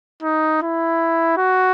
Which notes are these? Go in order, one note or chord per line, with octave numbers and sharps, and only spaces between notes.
D#4
E4
F#4